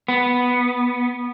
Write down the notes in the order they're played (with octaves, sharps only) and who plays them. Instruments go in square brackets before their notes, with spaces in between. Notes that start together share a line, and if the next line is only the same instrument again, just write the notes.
[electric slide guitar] B3